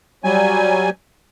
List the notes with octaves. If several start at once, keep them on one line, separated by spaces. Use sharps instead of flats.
F#3 G3 G#5